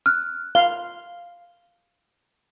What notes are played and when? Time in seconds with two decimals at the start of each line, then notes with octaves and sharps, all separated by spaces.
0.06 F6 F#6
0.55 F5 G7